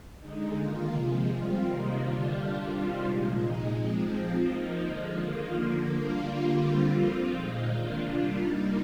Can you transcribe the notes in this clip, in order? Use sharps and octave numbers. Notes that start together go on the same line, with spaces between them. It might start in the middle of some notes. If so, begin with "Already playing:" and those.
D3 G#3 D#4
D#3 A#3 F4
C3 F3 G#3
G3 C4 F4
C3 D#3 A#3 D#4
D3 G3 D4 F4
G3 D4 F4
C3 D#3 G3 C4 F4
A#2 F3 G#3
A#2 G#3 D#4
F3 G#3 C4
F3 C4 F4
F3 A#3 D#4
D3 F3 G#3
D#3 A#3 F4
D3 F3 A#3
G3 A#3 D4 F4
D3 G3 A#3 F4
D3 G3 C4 F4
F3 C4 F4
A#2 G#3 D#4
D#3 A#3 D4 F4
C3 G3 D4 F4
G3 A#3 D#4